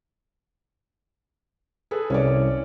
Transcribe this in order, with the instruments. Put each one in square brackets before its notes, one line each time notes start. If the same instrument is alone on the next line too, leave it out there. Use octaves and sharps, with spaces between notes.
[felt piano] G#4 A4 B4
[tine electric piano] C2 [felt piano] C#4 C#5 D5